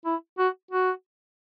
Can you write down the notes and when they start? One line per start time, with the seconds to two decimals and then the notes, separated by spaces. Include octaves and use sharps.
0.05 E4
0.38 F#4
0.71 F#4